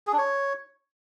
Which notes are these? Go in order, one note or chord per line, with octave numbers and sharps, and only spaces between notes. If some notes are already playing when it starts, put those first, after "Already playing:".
G#4
D4
C#5